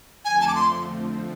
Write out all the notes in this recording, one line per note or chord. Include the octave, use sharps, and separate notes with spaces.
F2 D3 F3 A3 C4 G#5
A5
D6
C6